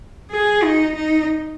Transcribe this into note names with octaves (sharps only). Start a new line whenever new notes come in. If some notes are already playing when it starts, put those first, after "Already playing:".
G#4
D#4
D#4